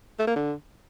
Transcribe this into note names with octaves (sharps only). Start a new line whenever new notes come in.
A3
A#3
D3